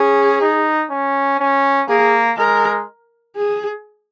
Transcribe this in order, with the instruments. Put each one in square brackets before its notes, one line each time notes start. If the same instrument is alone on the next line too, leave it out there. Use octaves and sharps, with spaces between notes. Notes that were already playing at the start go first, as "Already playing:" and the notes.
Already playing: [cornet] C#4 [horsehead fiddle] G#4
[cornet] D#4
C#4
C#4
[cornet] A#3 [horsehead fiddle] G#4
[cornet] G#3 [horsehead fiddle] A#4
[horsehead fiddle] G#4